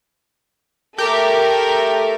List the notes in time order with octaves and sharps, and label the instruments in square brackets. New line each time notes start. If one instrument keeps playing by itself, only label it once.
[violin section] A3 A4 A#4 [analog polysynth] G4